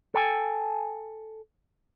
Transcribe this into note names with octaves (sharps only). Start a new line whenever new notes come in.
A4 G5 G#5